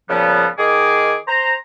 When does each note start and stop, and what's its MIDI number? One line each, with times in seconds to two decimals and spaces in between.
0.09 0.46 46
0.09 0.46 49
0.09 0.46 53
0.09 0.46 55
0.09 0.46 59
0.58 1.16 51
0.58 1.16 68
0.58 1.16 86
1.27 1.54 72
1.27 1.54 82